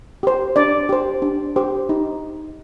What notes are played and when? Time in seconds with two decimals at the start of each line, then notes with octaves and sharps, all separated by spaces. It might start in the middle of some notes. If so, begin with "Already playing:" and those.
0.23 G4 C5
0.56 D4 D5
0.89 G4 C5
1.22 D4
1.56 G4 C5
1.89 D#4